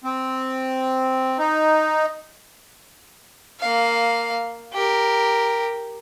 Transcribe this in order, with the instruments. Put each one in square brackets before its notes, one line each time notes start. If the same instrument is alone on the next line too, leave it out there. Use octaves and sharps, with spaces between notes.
[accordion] C4
D#4
[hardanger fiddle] A#3 F5
G4 A#4